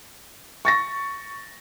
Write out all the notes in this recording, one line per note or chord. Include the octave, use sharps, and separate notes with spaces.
C#6 A6 A#6